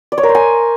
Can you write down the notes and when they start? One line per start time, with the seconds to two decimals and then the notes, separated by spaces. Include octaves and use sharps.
0.12 D5
0.18 C#5
0.23 A#4
0.29 C5
0.35 G#5